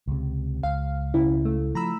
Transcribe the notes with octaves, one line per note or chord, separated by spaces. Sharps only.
C#2 C3
C#2 F5
C#3 E4
A3
F3 A#5 B5 E6